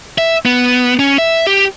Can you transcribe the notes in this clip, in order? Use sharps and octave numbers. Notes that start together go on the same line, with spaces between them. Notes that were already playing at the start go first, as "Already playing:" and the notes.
E5
B3
C#4
E5
G4